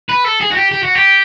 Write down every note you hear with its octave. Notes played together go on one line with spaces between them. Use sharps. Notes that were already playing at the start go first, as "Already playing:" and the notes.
B4
A4
G#4
F#4
G4
G4
F#4
G4